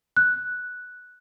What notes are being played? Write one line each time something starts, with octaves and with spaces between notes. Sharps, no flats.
F#6